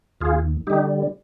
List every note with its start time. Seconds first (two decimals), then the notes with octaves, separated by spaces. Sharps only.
0.21 D#2 F4 G#4
0.67 D3 G3 D#4 G4